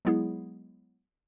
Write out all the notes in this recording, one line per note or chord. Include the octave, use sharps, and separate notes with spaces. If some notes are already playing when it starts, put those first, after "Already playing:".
F#3 G#3 B3 E4 G#4